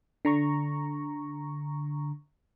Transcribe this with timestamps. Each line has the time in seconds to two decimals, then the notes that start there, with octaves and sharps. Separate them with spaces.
0.25 D3 A#5 C#6